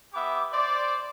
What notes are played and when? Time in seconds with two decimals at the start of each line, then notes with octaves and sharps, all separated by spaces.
0.13 B3 G4 E5 D6
0.52 C5 D5